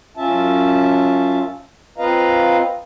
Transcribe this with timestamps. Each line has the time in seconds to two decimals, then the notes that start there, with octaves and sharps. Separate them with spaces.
0.17 F#2 C#4 F4 E5 A5
1.98 C4 F4 B4 D#5 F5 A#5